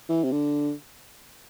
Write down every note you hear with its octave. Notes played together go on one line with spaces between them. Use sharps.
E3
C3
D3